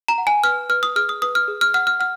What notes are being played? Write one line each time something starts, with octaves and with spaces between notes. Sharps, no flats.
A#5
F#5
G#5
B4 F6
B4 F6
D#6
G#4 F6
D#6
B4 D#6
F6
G#4
F6
F#5 F6
F6
F#5 F6